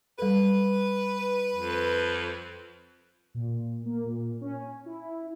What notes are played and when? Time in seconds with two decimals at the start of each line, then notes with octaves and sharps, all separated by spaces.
0.19 G3 A4 B4
1.55 F2
3.34 A#2
3.86 A#3
4.04 A#2
4.41 C#4
4.86 E4